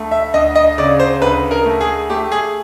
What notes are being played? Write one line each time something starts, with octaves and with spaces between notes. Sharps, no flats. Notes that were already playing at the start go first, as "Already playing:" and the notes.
Already playing: D2 A3
E5
D2 D#5
D#5
C#3 D5
C5
D2 B4
A#4
A3
G#4
A3 G4
G#4